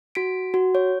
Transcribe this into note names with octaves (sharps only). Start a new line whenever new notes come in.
F#4 B6 D7
F#4
C#5